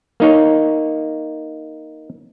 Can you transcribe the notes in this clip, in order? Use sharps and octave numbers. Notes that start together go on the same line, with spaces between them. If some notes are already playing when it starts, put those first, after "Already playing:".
A#3 D#4 C#5